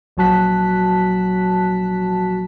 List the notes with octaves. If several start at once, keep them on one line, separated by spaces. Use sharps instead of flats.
A#1 F#3 F#4 A5 F#6 B6